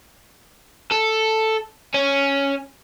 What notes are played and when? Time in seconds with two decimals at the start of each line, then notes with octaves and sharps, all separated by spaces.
0.91 A4
1.94 C#4